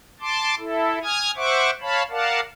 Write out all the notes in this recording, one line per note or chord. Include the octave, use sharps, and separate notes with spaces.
A5 C6 D6
E4 A4
G#5 D#6 F6 G#6
C5 E5 F#5 C#6 D6
C#5 F5 A5 B5
A#4 D5 F5 F#5 A5